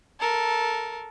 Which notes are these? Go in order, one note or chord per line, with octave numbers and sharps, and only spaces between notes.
A4 A#4